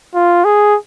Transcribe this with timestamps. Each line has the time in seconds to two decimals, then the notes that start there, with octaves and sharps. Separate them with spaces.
0.14 F4
0.45 G#4